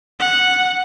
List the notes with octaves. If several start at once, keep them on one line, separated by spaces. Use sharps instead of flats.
F#5